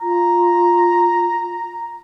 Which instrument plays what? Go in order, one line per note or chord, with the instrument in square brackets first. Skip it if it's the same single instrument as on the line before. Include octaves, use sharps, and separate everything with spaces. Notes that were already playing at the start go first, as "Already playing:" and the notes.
[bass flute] F4 [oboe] A#5